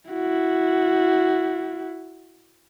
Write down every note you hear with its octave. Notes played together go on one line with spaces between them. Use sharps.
E4 F#4